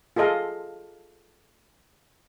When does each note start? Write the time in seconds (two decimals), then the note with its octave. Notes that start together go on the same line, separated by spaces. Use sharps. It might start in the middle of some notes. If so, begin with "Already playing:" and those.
0.16 F4 G#4 A4 D#5 F5